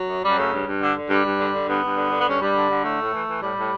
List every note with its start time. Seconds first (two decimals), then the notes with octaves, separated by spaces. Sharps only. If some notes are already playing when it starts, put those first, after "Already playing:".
Already playing: F#3
0.09 F#2
0.23 F#2 G3
0.37 C#3 A3
0.52 G2
0.66 G2
0.82 D3
0.96 D3
1.10 G2 G3
1.25 G2
1.40 D3
1.53 D3
1.68 G2 B3
1.83 G2
1.97 D3
2.11 D3
2.19 B3
2.27 G2 C#4
2.40 G2 G3
2.56 D3
2.70 D3
2.84 A2 A3
2.99 A2
3.13 E3
3.27 E3
3.42 A2 G3
3.56 A2